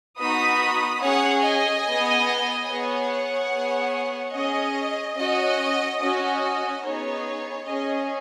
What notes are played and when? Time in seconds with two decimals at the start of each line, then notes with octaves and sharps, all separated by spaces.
0.18 B3 D#4 F#4 B5 D#6
1.01 C#4 G#4 C#5 F#5
1.42 D#5 G#5
1.84 B3 G#4
2.67 B3 G#4 C#5 F#5
3.51 B3 G#4
4.33 C#4 G#4 D#5
5.16 C#4 F#4 D#5
5.99 C#4 F#4 D#5
6.83 B3 D#4 G#4 C#5
7.66 C#4 G#4 D#5